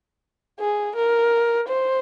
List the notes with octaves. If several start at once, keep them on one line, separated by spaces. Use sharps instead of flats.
G#4
A#4
C5